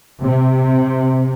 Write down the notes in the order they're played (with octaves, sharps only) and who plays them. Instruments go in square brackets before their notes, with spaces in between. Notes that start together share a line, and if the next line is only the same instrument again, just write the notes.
[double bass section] C3